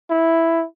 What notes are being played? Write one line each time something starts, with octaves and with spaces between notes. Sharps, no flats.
E4